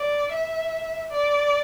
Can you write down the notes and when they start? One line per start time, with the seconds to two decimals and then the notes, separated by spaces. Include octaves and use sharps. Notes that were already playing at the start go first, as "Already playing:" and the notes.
Already playing: D5
0.32 E5
1.12 D5